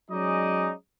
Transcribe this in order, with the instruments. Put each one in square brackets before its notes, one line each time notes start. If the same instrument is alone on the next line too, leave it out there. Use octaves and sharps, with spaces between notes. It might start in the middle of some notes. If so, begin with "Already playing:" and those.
[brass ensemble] F#3 G#3 C#4 D#4 D5 D#5